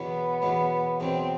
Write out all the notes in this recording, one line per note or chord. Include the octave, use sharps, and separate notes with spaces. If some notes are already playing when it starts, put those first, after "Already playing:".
Already playing: E2 B2 F#3 B3
E2 B2 F#3
E2 B2 F#3 C4